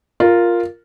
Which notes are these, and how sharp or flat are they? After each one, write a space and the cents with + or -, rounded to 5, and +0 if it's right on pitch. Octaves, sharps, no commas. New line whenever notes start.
F4 +0 A#4 +0